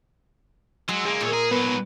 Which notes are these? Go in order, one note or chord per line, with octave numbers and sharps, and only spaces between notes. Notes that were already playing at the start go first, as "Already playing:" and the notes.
F#3 G#3 C6 E6
F#2 A#3 G#4
E2 A#2 C#5
G#4 A#4
G#2 F#3 B3 B4